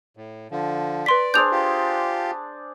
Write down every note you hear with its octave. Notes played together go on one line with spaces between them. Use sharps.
A2
D3 F3
B4 D5 C6 B6
D4 G#4 C5 G6 F7
F4 G4